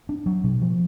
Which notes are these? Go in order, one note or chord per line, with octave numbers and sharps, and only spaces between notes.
D4
F#3
B2
F3